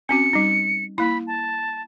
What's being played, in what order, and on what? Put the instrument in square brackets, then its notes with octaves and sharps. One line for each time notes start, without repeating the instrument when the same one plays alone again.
[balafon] C4 C#4 F#4 [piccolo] C#7
[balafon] G3 D#4
[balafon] A#3 E4 [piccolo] B5
[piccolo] A5